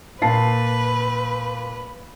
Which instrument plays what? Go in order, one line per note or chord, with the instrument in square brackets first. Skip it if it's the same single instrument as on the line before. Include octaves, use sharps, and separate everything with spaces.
[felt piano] A#2 A5 C7 [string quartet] B4